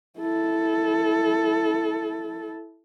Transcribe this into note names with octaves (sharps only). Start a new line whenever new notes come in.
E4 A4